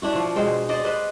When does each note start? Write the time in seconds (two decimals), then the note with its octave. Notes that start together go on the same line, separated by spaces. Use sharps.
0.02 D4 E4 F#4
0.15 F3
0.36 B2 G#3 C5 G5
0.69 C5 D5 D#5
0.84 B4 C5 D#5